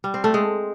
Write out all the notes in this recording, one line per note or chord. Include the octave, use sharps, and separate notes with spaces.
G3
C4
A3
G#3